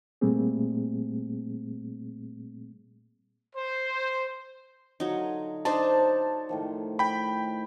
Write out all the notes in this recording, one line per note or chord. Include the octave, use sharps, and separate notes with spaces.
A#2 G3 A3 A#3 C4 G#4
C5
D3 F#3 D#4 F4
D4 D#4 C5 A5
C#5
A2 D#3 F3
G5 B5